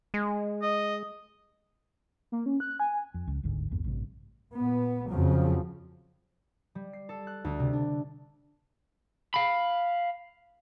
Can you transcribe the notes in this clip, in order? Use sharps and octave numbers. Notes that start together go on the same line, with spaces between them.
G#3
D#5
A#3
C#4
F#6
G#5
F2
C#2
G1 D2 G#2 D3
A#1 E2 G2 A#2
A1 G2 C3
A#2 B3
F2 C#3 F3 F#3
G3
C7
A4
F#6
D2
C3
D4
F5 B5